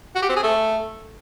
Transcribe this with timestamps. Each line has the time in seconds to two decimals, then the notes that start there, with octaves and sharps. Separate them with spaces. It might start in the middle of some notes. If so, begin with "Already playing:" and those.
0.15 F#4
0.22 G4
0.29 C4
0.36 G#4
0.43 A3